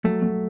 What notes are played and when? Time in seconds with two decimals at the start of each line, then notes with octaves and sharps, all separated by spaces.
0.04 F#3 A3
0.22 F#3